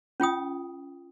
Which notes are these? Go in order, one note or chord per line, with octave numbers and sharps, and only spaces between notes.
C#4 F4 G5 D#6